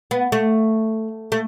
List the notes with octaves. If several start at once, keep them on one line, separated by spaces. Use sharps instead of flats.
B3
A3
A3